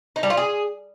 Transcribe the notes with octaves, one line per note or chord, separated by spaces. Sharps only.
D#4
G3
F4
G#4